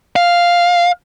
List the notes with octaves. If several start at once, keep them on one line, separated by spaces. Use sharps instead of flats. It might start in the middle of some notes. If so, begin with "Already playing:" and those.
F5